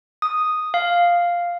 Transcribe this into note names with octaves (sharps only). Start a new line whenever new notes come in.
D#6
F5